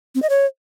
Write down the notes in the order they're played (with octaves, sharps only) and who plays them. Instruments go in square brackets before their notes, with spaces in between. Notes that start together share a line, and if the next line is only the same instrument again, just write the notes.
[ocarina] C4
D#5
C#5